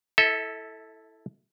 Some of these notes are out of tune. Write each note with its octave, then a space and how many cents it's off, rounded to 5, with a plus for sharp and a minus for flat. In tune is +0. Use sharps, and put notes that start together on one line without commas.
E4 -5 A4 +0 E5 -40